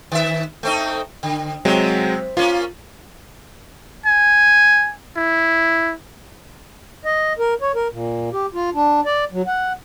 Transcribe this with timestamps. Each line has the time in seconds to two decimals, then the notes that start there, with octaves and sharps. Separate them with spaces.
0.12 D#3 E5
0.63 A3 C4 D#4
1.23 D3
1.65 C3 F#3 G#3 C4
2.37 A#3 C#4 F4
4.06 G#5
5.17 E4
7.05 D#5
7.39 A#4
7.61 C#5
7.75 A#4
7.93 A#2
8.33 G4
8.54 F4
8.74 D4
9.05 D5
9.32 F#3
9.47 F#5